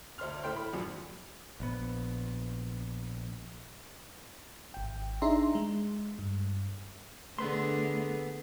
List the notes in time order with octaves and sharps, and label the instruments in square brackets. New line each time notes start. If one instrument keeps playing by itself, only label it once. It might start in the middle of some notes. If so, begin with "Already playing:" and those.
[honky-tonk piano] D2 C5 C6 F6
A2 A3 C5 G5 C6
B5
C#2 F#2 A#2 F3
[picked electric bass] A#1 B3
[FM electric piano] G#1 G5
D4 D#4 G#4 E5 A#5 C6
G#3
G2
[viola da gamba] D3 G#4 [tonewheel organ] A3 [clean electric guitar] B3 B4 C6